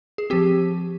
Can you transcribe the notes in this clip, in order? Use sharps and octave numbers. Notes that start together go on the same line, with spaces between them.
G#4
F3 C4 G4